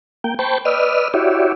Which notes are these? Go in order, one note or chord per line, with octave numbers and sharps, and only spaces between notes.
A#3 G5
C5 G5 A5 B5 C#6
B4 D5 D#5 E6 F6
E4 F#4 G4 C#5 D5 E5